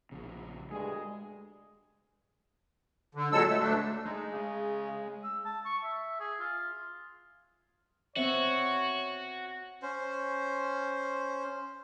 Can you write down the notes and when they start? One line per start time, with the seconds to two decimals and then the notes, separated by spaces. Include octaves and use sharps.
0.12 A#1 C#3
0.71 D2 G2 G#3 G#4
3.15 D3
3.32 A#2 F#3 G#3 A4 E6
3.48 A3
3.60 D2 A3 D4
4.05 G#3 D#4
4.32 C#3
5.24 E6
5.45 A5
5.65 C#6
5.84 E5
6.20 G#4
6.40 F4
8.16 B3 C4 F#4 C#5 E5
9.82 C#4 C5